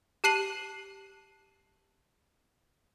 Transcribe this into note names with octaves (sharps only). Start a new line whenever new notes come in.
G4 A5 F#6 C7 D#7 F#7